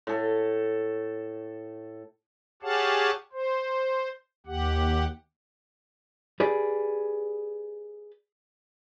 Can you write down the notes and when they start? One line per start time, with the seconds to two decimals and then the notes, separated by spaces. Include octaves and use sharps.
0.07 A2 A4
2.62 G4 G#4 C#5 F5 F#5 A5
3.33 C5
4.46 D#2 G4 F#5
6.40 G4 G#4 B4 D5